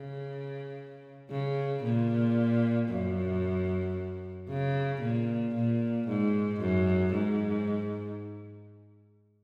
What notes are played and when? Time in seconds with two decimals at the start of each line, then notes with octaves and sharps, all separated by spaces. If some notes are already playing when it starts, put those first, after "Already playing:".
Already playing: C#3
1.31 C#3
1.84 A#2
2.90 F#2
4.49 C#3
5.02 A#2
5.55 A#2
6.08 G#2
6.61 F#2
7.14 G#2